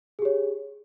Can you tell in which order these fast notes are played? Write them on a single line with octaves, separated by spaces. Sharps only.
G#4 G4 C#5